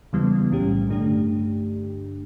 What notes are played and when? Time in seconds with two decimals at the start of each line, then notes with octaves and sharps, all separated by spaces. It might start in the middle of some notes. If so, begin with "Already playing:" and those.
0.13 E2 C#3 E3 G3 B3
0.50 B1 A2 G3 C#4 G4
0.88 G2 D3 A3 D4 G4